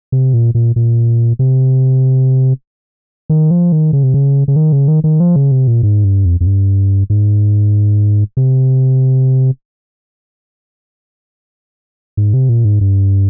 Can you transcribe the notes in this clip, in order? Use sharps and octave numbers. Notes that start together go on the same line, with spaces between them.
C3
A#2
A#2
A#2
C3
D#3
F3
D#3
C#3
C3
C#3
C#3
D#3
C#3
D#3
D#3
F3
C#3
C3
A#2
G#2
G2
F2
F2
G2
G#2
C3
G#2
C3
A#2
G#2
G2